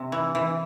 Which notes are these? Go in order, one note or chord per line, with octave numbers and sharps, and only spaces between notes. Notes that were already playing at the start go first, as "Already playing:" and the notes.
Already playing: C3
E3
E3